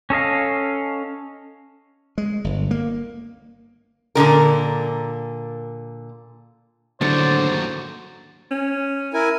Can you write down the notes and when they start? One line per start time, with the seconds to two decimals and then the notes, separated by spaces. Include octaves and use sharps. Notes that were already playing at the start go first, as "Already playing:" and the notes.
0.10 C#4 A4 D#5 F5
2.18 G#3
2.44 G1
2.71 A#3
4.15 A#2 D3 D#3 A#4
7.01 D#2 A2 D3 F#3 A3 C5 D5
8.51 C#4
9.14 E4 A#4 G#5